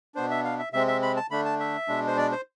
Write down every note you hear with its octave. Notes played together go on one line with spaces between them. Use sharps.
B2 B3 D4 C5
E5
F5
E5
C3 G#3 C4 E5
E5
B5
A5
D3 A3 D4 B5
A5
E5
B2 G#3 D4
C5
D5
C5